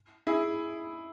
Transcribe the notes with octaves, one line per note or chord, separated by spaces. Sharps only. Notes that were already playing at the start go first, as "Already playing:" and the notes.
E4 G#4